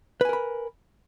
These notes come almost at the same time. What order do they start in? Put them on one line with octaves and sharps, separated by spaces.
B4 G#5 A#4 B5